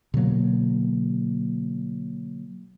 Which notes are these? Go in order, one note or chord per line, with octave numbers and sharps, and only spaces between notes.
B2 D3 F#3 A#3